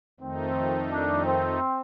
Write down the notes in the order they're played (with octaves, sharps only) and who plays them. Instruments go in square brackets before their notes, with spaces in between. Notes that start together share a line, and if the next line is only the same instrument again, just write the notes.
[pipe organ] F2 D#3 A3 D#4 [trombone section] C4
[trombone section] D4
C4